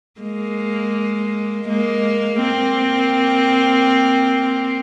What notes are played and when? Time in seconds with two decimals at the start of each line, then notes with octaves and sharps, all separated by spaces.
0.21 G#3 A#3
1.68 G#3 A#3
2.41 A#3 C4